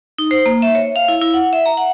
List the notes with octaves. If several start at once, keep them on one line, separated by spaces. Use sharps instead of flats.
D#4
C5
A#3
E5
C#5
F5
E4
E4
F#5
E5
A#5
F#5